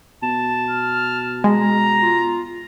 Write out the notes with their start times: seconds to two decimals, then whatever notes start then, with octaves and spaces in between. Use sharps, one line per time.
0.23 B2 A5
0.70 F6
1.44 G#3 A#5
2.02 F4